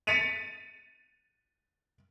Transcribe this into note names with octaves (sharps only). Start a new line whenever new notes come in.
A6 B6 C#7 D#7 F7